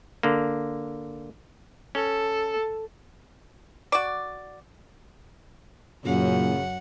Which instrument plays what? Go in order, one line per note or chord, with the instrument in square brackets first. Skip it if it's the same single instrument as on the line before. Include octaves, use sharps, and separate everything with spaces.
[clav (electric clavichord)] D3 A#3
[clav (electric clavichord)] C#4 [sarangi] A4
[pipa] F#4 D5
[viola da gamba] F#2 [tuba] A#2 [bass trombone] C#3 [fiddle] F#5